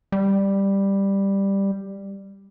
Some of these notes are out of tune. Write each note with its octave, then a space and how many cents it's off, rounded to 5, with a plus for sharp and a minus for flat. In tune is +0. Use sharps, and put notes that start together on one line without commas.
G3 +5